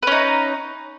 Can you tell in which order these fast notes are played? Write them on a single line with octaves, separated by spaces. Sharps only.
B4 C#4 D#4